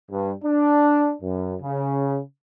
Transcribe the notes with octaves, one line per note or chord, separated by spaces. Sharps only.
G2
D4
F#2
C#3